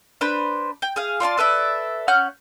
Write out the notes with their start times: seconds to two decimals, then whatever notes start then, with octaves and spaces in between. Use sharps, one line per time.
0.21 D4 B4 C5 B5
0.82 G5
0.96 G#4 F5
1.20 F4 D5 A5 C6
1.37 A4 B4 D5 E5
2.08 C#4 F#5 F6 G6